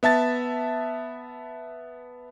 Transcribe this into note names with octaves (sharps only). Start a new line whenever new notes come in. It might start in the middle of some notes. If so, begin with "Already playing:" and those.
B3 E5 A5 A6